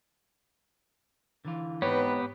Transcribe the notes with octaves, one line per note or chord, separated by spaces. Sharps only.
D3 E3 F4
G#2 B3 C4 D#4 G4 B4 C#5